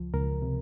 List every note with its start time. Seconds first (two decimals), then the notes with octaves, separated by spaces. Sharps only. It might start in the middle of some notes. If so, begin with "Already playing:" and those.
Already playing: C#2 F3
0.13 C#2 A#4
0.42 C3